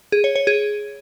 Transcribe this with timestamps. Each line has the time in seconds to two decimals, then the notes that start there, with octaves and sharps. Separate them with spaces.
0.12 G#4
0.24 C#5
0.35 C#5
0.47 G#4